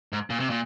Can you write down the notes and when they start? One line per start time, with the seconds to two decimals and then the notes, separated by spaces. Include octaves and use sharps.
0.13 G#2
0.30 A#2
0.40 C3
0.50 A#2